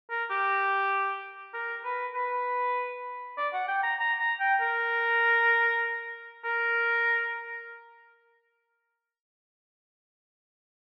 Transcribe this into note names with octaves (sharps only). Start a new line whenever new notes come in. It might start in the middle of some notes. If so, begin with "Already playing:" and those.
A#4
G4
A#4
B4
B4
D5
F#5
G5
A#5
A#5
A#5
G5
A#4
A#4